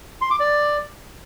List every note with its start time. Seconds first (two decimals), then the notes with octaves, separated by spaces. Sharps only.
0.21 C6
0.31 D6
0.40 D5